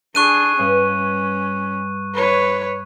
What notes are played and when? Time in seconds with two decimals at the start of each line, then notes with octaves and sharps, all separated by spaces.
0.15 D4 G#4 C#6 F#6 D#7
0.59 G2 C#4
2.15 B4 C#5